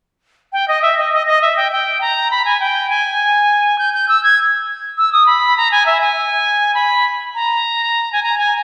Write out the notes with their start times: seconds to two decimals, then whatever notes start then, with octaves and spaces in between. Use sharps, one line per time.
0.53 G5
0.68 D#5
0.82 E5
0.98 D#5
1.13 D#5
1.27 D#5
1.42 E5
1.57 G5
1.72 G5
2.01 A#5
2.31 B5
2.45 G#5
2.60 G5
2.90 G#5
3.79 G6
3.94 G6
4.08 E6
4.23 G#6
4.98 E6
5.13 D#6
5.26 B5
5.57 A#5
5.71 G#5
5.86 E5
6.01 G#5
6.74 B5
7.35 A#5
8.13 G#5
8.23 A#5
8.38 G#5